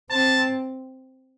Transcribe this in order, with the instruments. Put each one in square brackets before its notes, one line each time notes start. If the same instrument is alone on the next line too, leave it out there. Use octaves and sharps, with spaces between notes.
[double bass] C4 [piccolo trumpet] A5